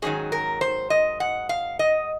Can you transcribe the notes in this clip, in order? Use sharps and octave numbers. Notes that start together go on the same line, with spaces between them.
G#2 D#3 F#3 A#3 C#4 G#4
A#4
C5
D#5
F#5
F5
D#5